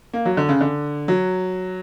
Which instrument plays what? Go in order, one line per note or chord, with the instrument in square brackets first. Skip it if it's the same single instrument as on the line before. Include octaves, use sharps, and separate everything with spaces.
[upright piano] A#3
F#3
D3
C#3
D3
F#3